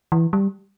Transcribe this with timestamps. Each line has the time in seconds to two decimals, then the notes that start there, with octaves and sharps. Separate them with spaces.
0.12 E3
0.33 G3